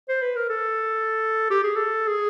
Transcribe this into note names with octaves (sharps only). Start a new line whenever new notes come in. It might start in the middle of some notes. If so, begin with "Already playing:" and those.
C5
B4
A#4
A4
G4
G#4
A4
G#4